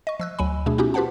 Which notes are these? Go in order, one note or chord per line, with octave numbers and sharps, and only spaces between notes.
D#5 C#6
F3 E6 F#6
D2 F#3 G#5 B5
B2 A3 D4 G#4
B3 C#4 D#4 E4 F#4 G4
F4 G4 B4 C5 F#5 A5